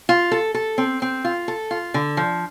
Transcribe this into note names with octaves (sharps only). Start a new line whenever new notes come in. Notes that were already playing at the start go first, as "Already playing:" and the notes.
F4
A4
A4
C4
C4
F4
A4
F4
D3
F3